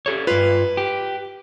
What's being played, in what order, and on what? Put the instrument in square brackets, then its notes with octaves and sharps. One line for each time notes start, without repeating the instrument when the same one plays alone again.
[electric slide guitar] G4 A4 C#5
[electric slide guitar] G2 F4 [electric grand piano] B4
[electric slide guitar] G4